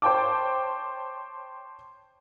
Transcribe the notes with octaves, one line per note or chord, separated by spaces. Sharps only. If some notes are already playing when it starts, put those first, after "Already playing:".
C5 C#5 G5 A5 D6